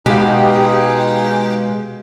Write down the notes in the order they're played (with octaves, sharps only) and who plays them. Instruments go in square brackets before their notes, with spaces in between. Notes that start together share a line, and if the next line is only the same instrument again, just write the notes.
[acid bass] B2 [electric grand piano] G#3 F5 [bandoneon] D#4 G#4 [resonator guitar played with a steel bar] G4